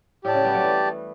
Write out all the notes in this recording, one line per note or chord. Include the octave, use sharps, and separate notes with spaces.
A2 G4 D5 A5
C#3
G3 B3
F#3 A3
E3 G3